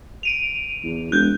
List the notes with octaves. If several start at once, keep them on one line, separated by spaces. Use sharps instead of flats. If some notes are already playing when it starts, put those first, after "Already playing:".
D7 D#7 F7
E2
E1 F#6 G6